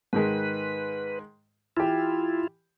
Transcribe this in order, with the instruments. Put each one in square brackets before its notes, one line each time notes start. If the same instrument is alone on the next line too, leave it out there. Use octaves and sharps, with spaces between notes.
[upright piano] G#2 D#3 G#3 [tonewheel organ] B4
[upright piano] E3 G4 [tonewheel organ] E4 F4